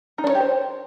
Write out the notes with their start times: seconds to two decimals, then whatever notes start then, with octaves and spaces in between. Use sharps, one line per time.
0.18 D#4
0.24 D4
0.29 C#5
0.35 G4
0.40 C5